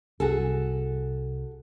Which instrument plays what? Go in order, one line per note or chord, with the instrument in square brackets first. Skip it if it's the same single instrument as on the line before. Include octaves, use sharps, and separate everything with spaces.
[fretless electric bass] C2 [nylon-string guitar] F#4 G#4 A4